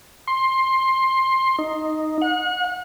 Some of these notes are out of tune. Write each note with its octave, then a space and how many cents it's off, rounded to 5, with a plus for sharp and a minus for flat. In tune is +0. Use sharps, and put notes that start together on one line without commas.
C6 +15
D#4 +0
F#5 -35